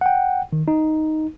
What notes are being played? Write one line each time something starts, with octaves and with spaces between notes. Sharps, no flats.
F#5 G5
D#3
D#4